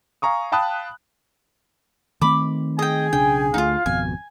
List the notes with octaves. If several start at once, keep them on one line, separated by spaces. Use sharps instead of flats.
F5 G#5 A#5 C#6 D#6
F5 G5 A5 B5 D#6 F#6
D#3 A3 C4 B5 D6
G#4 D#5 G5 G#5
B1 C#3 D4 G5
D2 A3 D#4 F4 F5
G#1 F2 B2 G#5